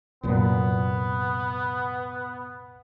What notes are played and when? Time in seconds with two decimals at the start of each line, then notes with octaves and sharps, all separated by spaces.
0.23 C2 F#2 A#2 B3